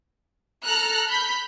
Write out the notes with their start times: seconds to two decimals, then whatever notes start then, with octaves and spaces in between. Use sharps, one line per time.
0.63 A4 A#5 F6 F#6
1.08 B5 G6 B6